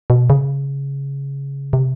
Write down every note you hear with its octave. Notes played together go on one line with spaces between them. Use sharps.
B2
C#3
C3